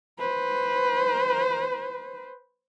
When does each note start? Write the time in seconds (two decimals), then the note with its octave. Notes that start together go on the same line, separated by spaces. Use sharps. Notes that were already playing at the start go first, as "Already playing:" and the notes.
0.19 B4 C5